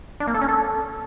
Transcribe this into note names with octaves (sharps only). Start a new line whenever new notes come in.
D4
A#3
A4
C#4
A4